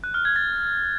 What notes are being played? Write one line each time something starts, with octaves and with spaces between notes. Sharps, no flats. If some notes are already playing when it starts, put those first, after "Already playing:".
F#6
F6
G#6
A6